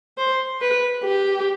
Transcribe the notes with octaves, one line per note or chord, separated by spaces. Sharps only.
C5
B4
G4